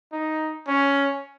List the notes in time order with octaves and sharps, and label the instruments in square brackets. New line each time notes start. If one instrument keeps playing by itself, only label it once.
[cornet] D#4
C#4